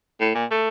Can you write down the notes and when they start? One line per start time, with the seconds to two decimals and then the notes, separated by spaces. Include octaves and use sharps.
0.20 A2
0.35 A#2
0.51 A3